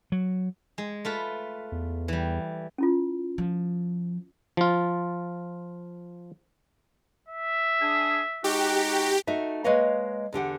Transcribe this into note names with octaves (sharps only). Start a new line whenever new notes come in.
F#3
G#3
A3 F4 B4
E2
E3 G3
C#4 E4 F4
F3
F3 F4
E5
D4 G#4
G#3 D#4 F#4 G4
A3 D#4 F#4 E5
G#3 A#3 B4 C#5 D#5 F5
E2 D3 G4 F#5